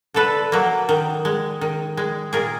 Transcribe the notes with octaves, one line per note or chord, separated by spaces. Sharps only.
D3 A4 B4
F#3 A#3
D#3
G#3
D#3
G#3
A#2 G#4 A#4